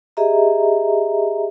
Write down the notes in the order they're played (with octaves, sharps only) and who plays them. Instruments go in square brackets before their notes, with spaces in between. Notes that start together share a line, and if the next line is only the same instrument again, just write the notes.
[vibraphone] G4 G#4 D#5 E5 A#5